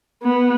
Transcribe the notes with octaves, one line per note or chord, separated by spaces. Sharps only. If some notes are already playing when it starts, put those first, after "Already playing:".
B3